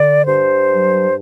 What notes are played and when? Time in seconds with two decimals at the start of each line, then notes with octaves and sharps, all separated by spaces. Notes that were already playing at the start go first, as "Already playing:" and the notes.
Already playing: D3 D5
0.25 G2 C5
0.67 F#3